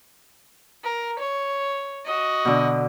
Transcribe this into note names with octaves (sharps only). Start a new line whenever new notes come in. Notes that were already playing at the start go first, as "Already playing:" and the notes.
A#4
C#5
F#4 D#5
B2 D3